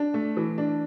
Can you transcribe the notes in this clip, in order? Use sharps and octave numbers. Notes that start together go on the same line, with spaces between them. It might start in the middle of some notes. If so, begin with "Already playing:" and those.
Already playing: D4
A3
E3
D4